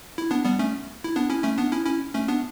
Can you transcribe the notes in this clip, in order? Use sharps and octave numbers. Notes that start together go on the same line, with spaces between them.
E4
B3 D4
G3 B3
A3 C#4
E4
B3 D4
C#4 E4
A3 C#4
B3 D4
C#4 E4
C#4 E4
A3 C#4
B3 D4